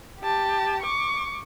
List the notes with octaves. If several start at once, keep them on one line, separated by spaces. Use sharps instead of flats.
G4 A5
C#6 D6